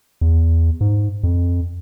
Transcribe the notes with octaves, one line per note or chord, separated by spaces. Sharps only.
E2
G#2
F2